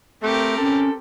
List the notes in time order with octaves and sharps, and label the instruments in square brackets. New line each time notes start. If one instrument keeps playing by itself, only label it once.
[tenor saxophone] A3 [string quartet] C4 G4 A#4
[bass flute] C#4 [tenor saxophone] A4